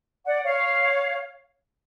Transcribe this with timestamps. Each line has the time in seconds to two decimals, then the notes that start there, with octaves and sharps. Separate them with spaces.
0.26 D5 F#5
0.43 C#5 F5